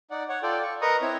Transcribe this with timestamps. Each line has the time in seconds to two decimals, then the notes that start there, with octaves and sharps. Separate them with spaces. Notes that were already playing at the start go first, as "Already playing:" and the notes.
0.11 D#4 D5 F#5
0.29 C#5 F#5
0.43 F4 A4 D5 G5
0.63 C#6
0.82 A#4 B4 D#5 A#5 C#6 D#6
1.02 C4 E4 C#5